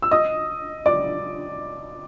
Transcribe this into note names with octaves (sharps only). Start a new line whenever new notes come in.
E6
D#5 D#6
D5 D6